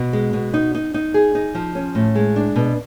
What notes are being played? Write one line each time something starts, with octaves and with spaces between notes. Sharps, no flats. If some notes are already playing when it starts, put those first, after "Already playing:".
Already playing: B2
G#3
B2
D#4
D#4
D#4
G#4
D#4
F3
C#4
A2
G#3
D4
B2